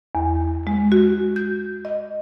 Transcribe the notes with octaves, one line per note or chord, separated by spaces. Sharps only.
E2
G#3
F#4
G6
D#5